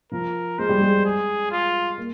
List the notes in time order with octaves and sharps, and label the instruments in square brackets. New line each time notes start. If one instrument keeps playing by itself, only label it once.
[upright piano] F3 [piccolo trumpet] A#4
[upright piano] G#3 [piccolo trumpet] C5
[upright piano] G3
G#3
[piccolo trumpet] G#4
F4
[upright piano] A#3